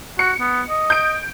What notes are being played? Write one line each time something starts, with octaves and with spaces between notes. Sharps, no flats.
F#4 C#7
B3
D#5
G6 D7